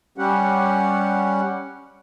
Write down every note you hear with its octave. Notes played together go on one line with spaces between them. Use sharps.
G3 C#4 G4 F#5